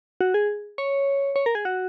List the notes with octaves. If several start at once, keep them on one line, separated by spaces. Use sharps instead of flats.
F#4
G#4
C#5
C#5
A#4
G#4
F#4